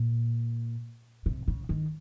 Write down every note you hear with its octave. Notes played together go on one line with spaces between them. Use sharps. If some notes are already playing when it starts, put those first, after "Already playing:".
Already playing: A#2
C3
C#3
D#3